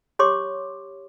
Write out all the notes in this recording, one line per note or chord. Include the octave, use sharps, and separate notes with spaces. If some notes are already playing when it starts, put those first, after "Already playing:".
G4 C#5 C6 D6